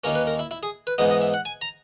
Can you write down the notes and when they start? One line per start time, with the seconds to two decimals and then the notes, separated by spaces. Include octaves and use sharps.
0.04 D#2 D#3 A#3 C#4 A#4
0.15 B4
0.27 A#4
0.39 E4
0.51 E4
0.63 G#4
0.87 B4
0.98 G#2 E3 B3 D#4 D#5
1.11 D#5
1.22 E5
1.34 F#5
1.45 G#5
1.61 A#5